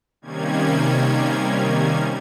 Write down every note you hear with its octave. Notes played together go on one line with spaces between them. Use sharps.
C3 D#3 G3 A#3 C#4 G#6